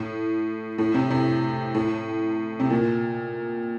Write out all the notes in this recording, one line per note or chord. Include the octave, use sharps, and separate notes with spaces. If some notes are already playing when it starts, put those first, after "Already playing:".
Already playing: A2
A2
C3
C3
A2
C3
A#2